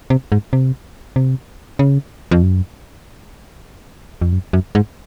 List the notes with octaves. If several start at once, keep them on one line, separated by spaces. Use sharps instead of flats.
C3
G#2
C3
C3
C#3
F2
F#2
F2
F#2
F#2
G#2